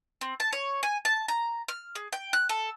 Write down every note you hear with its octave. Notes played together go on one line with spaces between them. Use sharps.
C4
A5
C#5
G#5
A5
A#5
F6
G#4
G5
F#6
A4